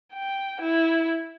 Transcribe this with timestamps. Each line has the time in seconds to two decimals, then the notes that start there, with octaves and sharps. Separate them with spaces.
0.14 G5
0.61 E4